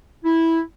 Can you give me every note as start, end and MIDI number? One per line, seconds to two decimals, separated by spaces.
0.25 0.61 64